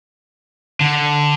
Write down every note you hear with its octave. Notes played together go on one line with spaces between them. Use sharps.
D3